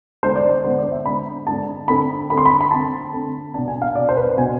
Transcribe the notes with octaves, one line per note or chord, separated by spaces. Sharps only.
D3 G#3 B3 D4 C5
D5
C5
D3 G#3 B3 D4 C5
D5
E5
D3 G#3 B3 D4 B5
D3 G#3 B3 D4 A5
D3 A3 C4 B5
D3 A3 C4 B5
C6
B5
B5
D3 A3 C4 A5
D3 A3 C4
B2 B3 D4 A5
G#5
F5
B2 B3 D4 D5
C5
B4
B2 B3 D4 G#5